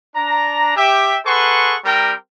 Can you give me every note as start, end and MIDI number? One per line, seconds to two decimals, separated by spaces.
0.15 0.72 62
0.15 0.72 82
0.76 1.16 67
0.76 1.16 76
0.76 1.16 79
1.25 1.75 68
1.25 1.75 69
1.25 1.75 71
1.25 1.75 78
1.25 1.75 84
1.25 1.75 85
1.84 2.13 55
1.84 2.13 60
1.84 2.13 70
1.84 2.13 79
1.84 2.13 82